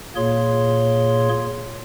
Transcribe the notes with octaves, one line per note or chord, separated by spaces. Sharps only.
A#2 A#3 G#4 C#5 C6